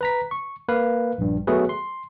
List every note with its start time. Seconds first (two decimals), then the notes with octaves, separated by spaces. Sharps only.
0.01 B4 A#5 B6
0.31 C#6
0.68 A#3 B4 F5
1.18 A#1 G2
1.47 F#3 A3 B3 F#4 G#4 B4
1.69 C6